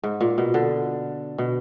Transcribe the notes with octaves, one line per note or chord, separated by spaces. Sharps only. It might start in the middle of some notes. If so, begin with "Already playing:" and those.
G#2
A#2
B2
D3
B2